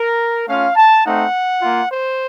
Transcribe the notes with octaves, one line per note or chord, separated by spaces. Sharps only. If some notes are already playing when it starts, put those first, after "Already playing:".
Already playing: A#4
A3 C#4 F4 F5
A5
A3 C4 D#4 F#5
A#3 F4
C5